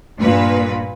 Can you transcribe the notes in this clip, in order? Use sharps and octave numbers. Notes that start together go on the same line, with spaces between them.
G2 A#2 B4